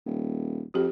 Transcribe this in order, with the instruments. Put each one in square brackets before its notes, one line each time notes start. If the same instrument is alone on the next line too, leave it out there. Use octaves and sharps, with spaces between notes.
[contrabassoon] D#1
[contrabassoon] F2 [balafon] F#4 G4